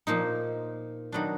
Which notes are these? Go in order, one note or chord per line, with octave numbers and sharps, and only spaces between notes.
A#2 F3 A#3 D#4
D#3 F#3 B3 D4